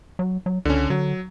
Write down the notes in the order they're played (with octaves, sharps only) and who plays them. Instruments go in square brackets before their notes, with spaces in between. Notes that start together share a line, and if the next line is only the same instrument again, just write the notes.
[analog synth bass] F#3
F#3
[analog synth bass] C#2 [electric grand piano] D3 C#4
[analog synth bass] D3 [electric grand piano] F#3